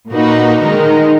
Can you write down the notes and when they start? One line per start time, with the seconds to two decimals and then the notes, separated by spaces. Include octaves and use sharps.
0.13 A#2 A#3 D#4 F#4 B4
0.61 D#3 G#3 D#4 A#4